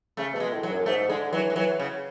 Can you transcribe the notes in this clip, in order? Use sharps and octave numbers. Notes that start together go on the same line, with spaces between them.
C#3 A3
B2 A3
G#3
A2
F#3
F#2
G#2 A3
D3 G#3
E3 F#3
G#3
E3 F#3
C#3